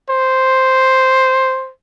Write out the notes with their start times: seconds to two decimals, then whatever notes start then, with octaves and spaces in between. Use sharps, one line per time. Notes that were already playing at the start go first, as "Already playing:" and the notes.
0.08 C5